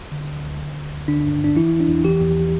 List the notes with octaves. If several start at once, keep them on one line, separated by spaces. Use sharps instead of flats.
D3
D2
D2
D3
D2
D2
D3 D4
D4
G2
G2 D4
E3 E4
E2
D4
E2
E3 G4
E2